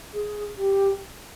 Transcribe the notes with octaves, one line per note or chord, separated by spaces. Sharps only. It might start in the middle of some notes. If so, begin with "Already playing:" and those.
G#4
G4